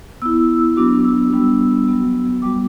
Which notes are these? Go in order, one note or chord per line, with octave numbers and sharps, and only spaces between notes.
B3 E4 E6
F#3 B3 D4 F#4 D6
E6
G3 B3 D4 F#4
F#3 B3 F#4
G3 B3 F#4 D6